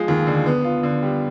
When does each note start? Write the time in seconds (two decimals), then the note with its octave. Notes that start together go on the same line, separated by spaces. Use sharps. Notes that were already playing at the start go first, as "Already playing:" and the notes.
Already playing: F3 G#3
0.08 D#2
0.27 D3
0.46 B3
0.64 F4
0.83 D3
1.02 G3